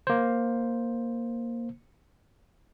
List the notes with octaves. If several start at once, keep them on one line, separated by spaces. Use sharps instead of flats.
A#3 C5